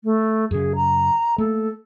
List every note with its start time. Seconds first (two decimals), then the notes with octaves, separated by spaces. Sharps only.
0.04 A3
0.51 F#2 C#3 G#4
0.75 A#5
1.38 A3 A#3 A4